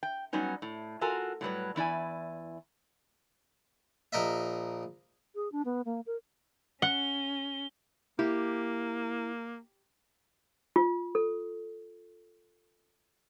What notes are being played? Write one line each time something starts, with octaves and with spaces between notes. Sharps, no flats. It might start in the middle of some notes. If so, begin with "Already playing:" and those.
G5
F#3 G3 B3 C#4 D#4
A2
F4 F#4 A4 A#4 G#5 A#5
A2 F#3 G3 B4
E2 E4 D5 G#5
A#1 A#4 D#5 E5
G#4
D4
B3
A#3
A#4
C#4 F#5 G7
A#3 E4 G4
F4
A4